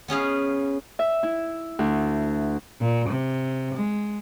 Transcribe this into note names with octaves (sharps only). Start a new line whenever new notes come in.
B3 C#4 G#4 F5
E5
E4
D2
A#2
C3
G#3